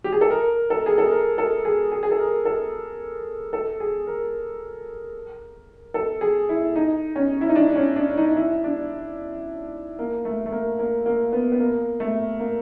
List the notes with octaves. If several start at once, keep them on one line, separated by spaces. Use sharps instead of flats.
G4
G#4
A4
A#4
A4
G#4
A4
A#4
A4
G#4
G#4
G#4
A4
A#4
A4
A4
G#4
A#4
A4
G#4
E4
D#4
C#4
E4
D#4
D4
C#4
D4
D#4
E4
D4
A#3
A3
A3
A#3
A#3
A#3
B3
B3
A#3
A3
A#3